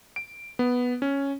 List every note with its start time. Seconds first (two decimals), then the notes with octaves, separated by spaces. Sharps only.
0.16 D7
0.59 B3
1.02 C#4